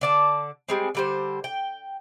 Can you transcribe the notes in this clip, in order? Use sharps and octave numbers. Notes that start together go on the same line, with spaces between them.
D3 D5 A5
G3 G#3 C4
D3 G3 C5
G5